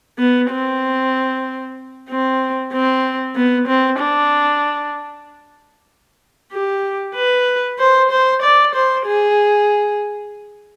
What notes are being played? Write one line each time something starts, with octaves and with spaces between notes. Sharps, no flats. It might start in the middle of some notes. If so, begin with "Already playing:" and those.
B3
C4
C4
C4
B3
C4
D4
G4
B4
C5
C5
D5
C5
G#4